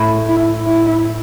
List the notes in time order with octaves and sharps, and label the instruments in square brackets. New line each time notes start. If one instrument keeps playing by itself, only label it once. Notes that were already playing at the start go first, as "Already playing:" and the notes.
Already playing: [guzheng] A2
[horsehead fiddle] E4
E4